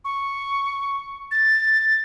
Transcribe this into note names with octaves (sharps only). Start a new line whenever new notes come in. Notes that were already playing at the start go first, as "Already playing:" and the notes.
C#6
A6